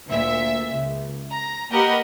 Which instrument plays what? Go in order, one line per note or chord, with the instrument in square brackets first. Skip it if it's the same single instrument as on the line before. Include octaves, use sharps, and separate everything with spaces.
[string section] D2 A#2 E5
C#2
A#5
A#3 G4 A#4 B4 D#5 F#5